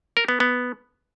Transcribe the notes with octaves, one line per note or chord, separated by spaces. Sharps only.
A#4
B3
B3